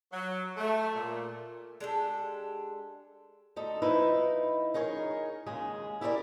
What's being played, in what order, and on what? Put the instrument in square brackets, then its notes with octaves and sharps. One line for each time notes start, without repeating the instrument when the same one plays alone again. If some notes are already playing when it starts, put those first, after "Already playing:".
[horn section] F#3
A3
A#2
[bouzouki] G#3 D4 G4 A4
[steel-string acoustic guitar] D2 D#4 A4
F3 D#4 E4 B4
D#4 G#4 A#4 C#5
D#2 C#3 G#3 G#4
E4 G4 G#4 A#4 B4 D5